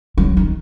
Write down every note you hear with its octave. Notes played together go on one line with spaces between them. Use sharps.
F#3
D#3